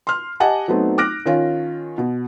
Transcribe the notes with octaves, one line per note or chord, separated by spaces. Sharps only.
C6 F6
G4 D#5 F#5 G#5 A5
F#3 A3 B3 C4 D#4
D6 F6 F#6 A#6 D7
D#3 C#4 F4
B2